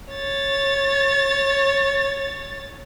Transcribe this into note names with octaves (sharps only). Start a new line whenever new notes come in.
C#5 A6